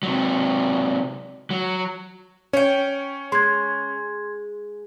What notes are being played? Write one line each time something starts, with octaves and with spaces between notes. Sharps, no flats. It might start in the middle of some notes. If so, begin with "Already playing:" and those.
C3 F#3
F#3
C#4 C#5 G5
G#3 C6 G#6